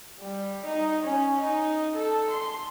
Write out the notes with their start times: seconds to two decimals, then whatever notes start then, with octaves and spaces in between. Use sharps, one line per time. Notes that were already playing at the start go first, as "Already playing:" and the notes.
0.20 G3
0.65 D#4
1.03 C#4
1.41 D#4
1.95 A4
2.30 C6